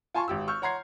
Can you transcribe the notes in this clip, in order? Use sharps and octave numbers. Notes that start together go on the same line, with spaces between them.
F4 G#5 A5 C6 C#6
G#1 G4 E6
C#6 E6 F6 G6
C#5 F#5 A#5 C6 G#6 C7